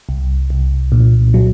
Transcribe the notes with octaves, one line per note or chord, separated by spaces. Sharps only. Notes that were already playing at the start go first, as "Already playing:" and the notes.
C2
C2
A#2
F#3